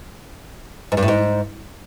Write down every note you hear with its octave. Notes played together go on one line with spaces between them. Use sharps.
G#2
G2
A2
G#2